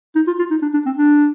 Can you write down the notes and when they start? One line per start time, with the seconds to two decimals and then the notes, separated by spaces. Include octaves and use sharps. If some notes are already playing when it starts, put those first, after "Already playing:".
0.16 D#4
0.27 F4
0.39 F4
0.51 D#4
0.62 D4
0.74 D4
0.86 C4
0.96 D4